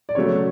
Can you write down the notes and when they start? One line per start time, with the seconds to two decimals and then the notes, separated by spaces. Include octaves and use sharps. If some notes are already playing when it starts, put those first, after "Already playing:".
0.09 D5
0.15 C#3 F#3 A3 C#5